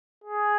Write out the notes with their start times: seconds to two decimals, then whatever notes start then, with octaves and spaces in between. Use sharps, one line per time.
0.24 G#4